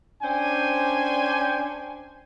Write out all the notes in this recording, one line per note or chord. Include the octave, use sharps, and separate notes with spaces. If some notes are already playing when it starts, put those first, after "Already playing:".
C#4 D4 C5 G5 G#5